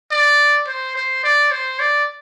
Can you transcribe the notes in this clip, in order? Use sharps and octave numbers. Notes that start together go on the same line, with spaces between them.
D5
C5
C5
D5
C5
D5